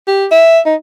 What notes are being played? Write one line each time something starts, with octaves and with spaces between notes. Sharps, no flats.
G4
E5
D#4